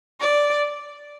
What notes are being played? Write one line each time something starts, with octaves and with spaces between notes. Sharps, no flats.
D5